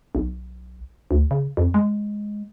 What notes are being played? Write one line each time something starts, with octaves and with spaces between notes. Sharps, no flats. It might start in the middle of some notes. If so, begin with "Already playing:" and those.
B1
D2
C#3
F2
G#3